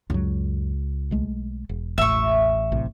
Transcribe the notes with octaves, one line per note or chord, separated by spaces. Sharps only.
C#2 F#2 F#3
B1 G#3 A3
E1
A1 E5 C#6
B1 A2 C3